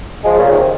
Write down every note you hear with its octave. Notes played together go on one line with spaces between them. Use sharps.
F3 G#3
A#2 C#3
C3 D#3